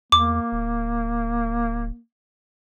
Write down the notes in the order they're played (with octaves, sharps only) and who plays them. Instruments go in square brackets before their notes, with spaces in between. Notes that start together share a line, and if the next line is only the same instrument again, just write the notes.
[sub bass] E2 [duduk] A#3 [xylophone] D6
[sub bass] D1